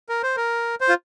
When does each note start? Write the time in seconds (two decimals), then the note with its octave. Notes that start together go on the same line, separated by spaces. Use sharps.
0.09 A#4
0.23 C5
0.37 A#4
0.81 C5
0.89 F4